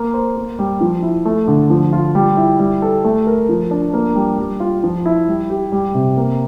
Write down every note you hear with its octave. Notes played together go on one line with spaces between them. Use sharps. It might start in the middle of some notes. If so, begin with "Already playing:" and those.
Already playing: A#3
C5
A#3
G3
F3
E4
A3
D3
F3
F4
G3
E4
G3
A4
A3
A#4
F3
D4
A#3
G3
G3
F4
F3
E4
G3
G4
G3
C3
A#3